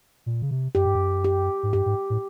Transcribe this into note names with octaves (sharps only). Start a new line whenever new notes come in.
A#2
C#3
C3
F#2 G4
G2
F#2
G4
G#2
G2 G4
G#2
A2